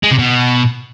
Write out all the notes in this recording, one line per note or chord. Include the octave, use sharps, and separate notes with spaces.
G#3
C3
B2